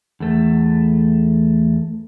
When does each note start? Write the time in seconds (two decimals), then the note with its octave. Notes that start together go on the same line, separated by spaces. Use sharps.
0.20 E2 A3